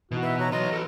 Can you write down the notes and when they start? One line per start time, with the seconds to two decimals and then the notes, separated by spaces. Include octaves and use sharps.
0.11 B2 E3 D#4 F#4
0.23 B4 E5
0.40 C#5 A#5
0.52 F#3 F#4 D#5 C6
0.73 A4 B4